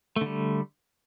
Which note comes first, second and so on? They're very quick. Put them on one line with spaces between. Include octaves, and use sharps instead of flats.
A3 D3 G3